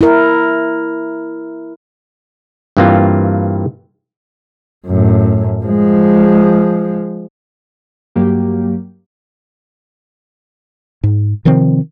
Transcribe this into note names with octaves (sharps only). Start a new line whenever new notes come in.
E4 A#4
G2 E3 A#3 C4 F4
F#2 A2
F3 G#3
G2 F#3 A#3 G4
G#2
C3 D#3 F3 C4